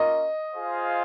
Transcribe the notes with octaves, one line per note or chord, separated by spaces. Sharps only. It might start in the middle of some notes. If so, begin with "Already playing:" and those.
Already playing: A#3 C#4 F4 A#4 D#5
F4 G#4 C5 F5